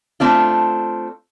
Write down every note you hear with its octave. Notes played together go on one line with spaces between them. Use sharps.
A3 C4 D4 F4